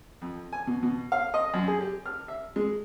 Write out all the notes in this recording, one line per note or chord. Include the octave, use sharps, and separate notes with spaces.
F2
G#5
B2
B2
F5
D#5
F#2
G#4
G4
F6
E5
G#3